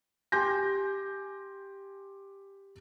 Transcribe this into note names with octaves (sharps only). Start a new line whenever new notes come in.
G4 G#5 C6 G6 A#6